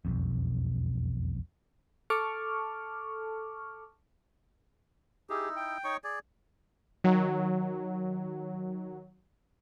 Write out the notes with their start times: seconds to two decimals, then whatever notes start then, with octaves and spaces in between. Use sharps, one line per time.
0.05 E1 B1 F2
2.10 A4 A5 C#6 D6 F6
5.30 D#4 E4 G4 G#4
5.56 G5
5.84 D#4 C#5 C#6
6.04 G#4 D5
7.04 D#3 F#3